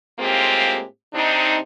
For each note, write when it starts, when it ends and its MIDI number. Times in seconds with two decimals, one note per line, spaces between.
0.19 0.85 45
0.19 0.85 56
0.19 0.85 58
0.19 0.85 60
0.19 0.85 65
0.19 0.85 67
1.14 1.59 48
1.14 1.59 60
1.14 1.59 62
1.14 1.59 63